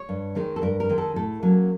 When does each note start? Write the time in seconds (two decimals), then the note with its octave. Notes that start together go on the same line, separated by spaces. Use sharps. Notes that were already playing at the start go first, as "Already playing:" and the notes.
Already playing: C#5
0.09 G2
0.35 D#3 G#3 C4 D#4
0.56 A4
0.62 G2 A#4
0.80 A#4
0.89 D#3 G#3 C4 D#4
0.98 A4
1.16 A2 A4
1.43 F#3 A#3 C#4